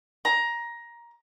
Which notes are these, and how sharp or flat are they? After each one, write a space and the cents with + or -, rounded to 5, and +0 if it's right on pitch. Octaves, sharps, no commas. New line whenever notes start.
A#5 +15